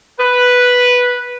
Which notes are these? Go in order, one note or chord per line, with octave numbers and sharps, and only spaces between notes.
B4